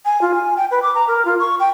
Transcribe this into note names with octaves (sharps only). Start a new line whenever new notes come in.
G#5
F4
G#5
G5
B4
D6
A#5
A#4
F4
C#6
G5